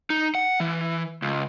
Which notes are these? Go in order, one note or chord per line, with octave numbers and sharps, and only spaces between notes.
D#4
F#5
E3
C#2